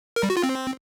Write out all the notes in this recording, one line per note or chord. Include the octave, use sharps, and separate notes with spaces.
A#4
G3
F#4
F4
C4